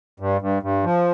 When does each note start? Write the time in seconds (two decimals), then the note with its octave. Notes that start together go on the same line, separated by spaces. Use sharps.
0.20 G2
0.41 G2
0.62 G2
0.84 F3